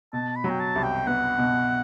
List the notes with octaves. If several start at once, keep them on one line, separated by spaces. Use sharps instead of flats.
B2 A5
B5
F#3
G5
A5
C2
G5
B3 F#5
B2